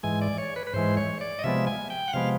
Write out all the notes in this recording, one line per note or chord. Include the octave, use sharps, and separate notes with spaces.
G#2 E3 G#3 G#5
D5
C#5
B4
B4
G#2 E3 G#3 C5
C#5
D5
D#5
C3 F3 G#3 B3 E5
G#5
G5
F#5
C3 F3 G#3 B3 F5